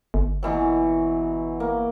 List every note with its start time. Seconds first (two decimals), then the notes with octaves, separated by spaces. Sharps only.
0.14 G1
0.43 B2 E3 F#3
1.60 A#3